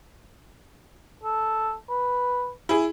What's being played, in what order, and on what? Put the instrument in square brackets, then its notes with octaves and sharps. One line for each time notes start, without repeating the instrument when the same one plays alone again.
[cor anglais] A4
B4
[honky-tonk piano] E4 G#4